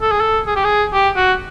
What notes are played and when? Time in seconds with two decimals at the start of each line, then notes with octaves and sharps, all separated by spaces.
0.02 A4
0.12 G#4
0.21 A4
0.47 G#4
0.56 G4
0.65 G#4
0.94 G4
1.16 F#4